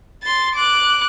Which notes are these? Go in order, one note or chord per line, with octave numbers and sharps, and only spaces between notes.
C6 A6
D6 F#6